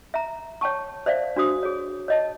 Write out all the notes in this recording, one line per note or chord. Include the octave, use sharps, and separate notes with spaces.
E5 A#5
C#5 G5 A5 C#6
C5 D5 E5 F5
D4 F#4 C5 D#6
G#4 C#5
C#5 D#5 A5